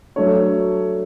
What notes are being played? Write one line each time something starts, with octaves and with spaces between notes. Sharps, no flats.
F#3 A3 D4 C#5